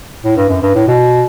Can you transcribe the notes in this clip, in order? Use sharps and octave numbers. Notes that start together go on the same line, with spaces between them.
A2
G2
F#2
G2
A2
B2